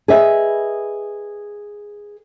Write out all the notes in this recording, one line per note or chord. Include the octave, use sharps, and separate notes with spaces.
G#4 B4 D#5 E5